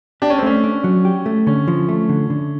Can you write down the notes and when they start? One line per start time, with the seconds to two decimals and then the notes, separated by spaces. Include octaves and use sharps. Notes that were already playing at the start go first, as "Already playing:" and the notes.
0.22 D4 G4
0.30 C#4
0.38 C4
0.43 A3 C#4
0.64 D4
0.84 F#3
1.05 G4
1.26 A3
1.47 D3 C#4
1.68 F3
1.89 A3
2.09 D3
2.30 D3